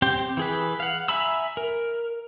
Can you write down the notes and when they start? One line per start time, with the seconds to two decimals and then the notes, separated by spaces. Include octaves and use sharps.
0.02 C4 G4 C5 G5
0.37 E3 G#4 B4
0.80 F5 F#5
1.08 E5 G#5 A#5 B5 E6
1.57 A#4